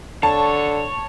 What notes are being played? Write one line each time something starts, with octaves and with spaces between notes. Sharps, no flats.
D3 C#5 A5